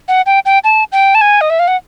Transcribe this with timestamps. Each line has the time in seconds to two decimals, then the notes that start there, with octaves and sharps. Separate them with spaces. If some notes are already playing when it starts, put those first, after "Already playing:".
0.08 F#5
0.26 G5
0.45 G5
0.64 A5
0.92 G5
1.15 A5
1.21 G#5
1.41 D#5
1.50 E5
1.59 F5
1.68 F#5